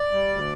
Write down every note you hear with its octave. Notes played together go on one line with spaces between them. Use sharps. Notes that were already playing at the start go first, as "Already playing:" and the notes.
Already playing: D5
G3
D2